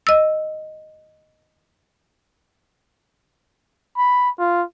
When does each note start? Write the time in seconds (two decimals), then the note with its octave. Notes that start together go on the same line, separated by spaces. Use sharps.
0.07 D#5 E6
3.97 B5
4.39 F4